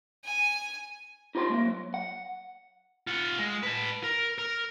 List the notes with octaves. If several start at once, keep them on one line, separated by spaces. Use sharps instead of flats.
G#5
D#4 F4 G4 C5 G#5 C6
G#3 A#3
F#3
F#5
F4 F#5
G#3
B4 A5
A#4
A#4